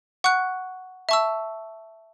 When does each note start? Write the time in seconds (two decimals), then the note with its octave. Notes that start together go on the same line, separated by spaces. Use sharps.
0.24 F#5 C#6 F#6
1.09 E5 A5 C#6 E6